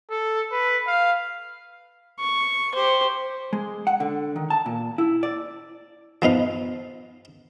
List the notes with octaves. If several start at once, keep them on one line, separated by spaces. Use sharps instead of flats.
A4
B4
F5
C#6
G4 C5
G#3
F#5
D3
D#3
A5
A#2
E4
D5
F3 B3 D#4 F5